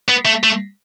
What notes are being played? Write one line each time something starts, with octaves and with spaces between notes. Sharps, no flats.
B3
A3
A3